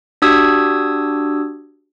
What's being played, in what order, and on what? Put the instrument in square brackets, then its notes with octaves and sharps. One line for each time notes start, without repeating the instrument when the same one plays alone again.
[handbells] D4 F#4 G4 D#6 E6 G#6